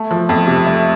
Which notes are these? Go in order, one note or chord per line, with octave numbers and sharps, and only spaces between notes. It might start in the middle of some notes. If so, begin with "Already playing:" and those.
Already playing: A3
F3
F2
C3
A3